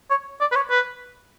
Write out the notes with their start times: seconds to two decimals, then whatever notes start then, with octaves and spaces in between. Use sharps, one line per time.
0.10 C#5
0.40 D5
0.52 B4
0.56 C#5
0.70 B4